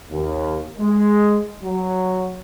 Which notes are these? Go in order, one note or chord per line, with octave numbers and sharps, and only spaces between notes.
D#2
G#3
F#3